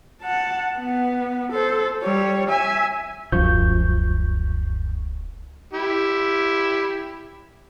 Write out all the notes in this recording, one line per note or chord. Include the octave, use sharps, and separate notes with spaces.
F#5 A5
B3
A4 C5
G3 C#5
E5 G#5
D#1 C#2 F#2 F3 F#3 C#6 G6
E4 G4